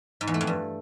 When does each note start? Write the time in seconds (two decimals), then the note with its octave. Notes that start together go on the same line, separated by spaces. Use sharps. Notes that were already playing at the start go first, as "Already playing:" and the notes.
0.21 G#2
0.27 E2
0.34 A3
0.41 F2
0.47 G2